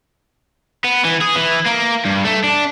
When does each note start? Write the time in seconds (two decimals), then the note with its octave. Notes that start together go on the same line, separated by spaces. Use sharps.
0.84 B3
1.04 E3
1.21 G#4
1.35 E3
1.66 A#3
2.05 G2
2.25 A3
2.44 D4